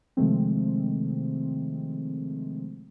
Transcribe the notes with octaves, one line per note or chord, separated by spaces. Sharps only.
C3 D#3 F3 G#3 A3 C4